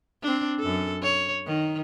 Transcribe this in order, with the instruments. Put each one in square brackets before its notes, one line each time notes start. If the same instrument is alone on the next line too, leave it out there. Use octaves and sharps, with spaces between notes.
[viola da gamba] C4 D4
F#2 A4
C#5
D#3